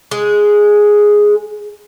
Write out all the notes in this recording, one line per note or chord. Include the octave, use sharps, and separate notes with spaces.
G#3 G#4